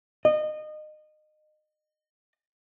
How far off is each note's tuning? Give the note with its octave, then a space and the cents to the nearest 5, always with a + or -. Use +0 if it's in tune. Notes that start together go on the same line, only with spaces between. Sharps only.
D#5 -25